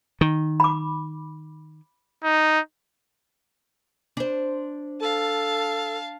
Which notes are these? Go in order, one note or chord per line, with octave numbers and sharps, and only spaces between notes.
D#3
B5 D6
D#4
D4 C5
A4 F5 A5